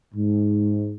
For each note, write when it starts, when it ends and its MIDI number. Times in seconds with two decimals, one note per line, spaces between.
0.14 0.96 44